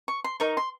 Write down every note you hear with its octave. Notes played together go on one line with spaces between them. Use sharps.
C#6
C6
D#4 A#4 D#5 C#6
C6